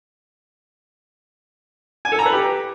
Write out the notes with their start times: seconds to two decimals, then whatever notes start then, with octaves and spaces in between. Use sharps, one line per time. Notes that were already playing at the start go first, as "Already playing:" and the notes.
2.05 G#5
2.12 A4
2.19 A#5
2.26 B4
2.32 G4